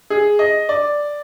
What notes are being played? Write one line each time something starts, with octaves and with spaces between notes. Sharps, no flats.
G#4
D#5
D5